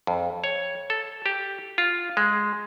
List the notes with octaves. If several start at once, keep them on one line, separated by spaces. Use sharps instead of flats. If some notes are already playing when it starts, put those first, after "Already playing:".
F2
C#5
A4
G4
F4
G#3